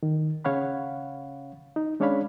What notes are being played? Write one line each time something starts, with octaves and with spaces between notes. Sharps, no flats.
D#3
C#3 C#4 C#5 F5 F#5 B5
D#4
G#3 C#4 D4 C#5 F5 B5